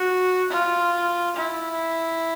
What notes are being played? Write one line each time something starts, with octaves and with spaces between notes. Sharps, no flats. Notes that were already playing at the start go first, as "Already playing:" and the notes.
Already playing: F#4
F4
E4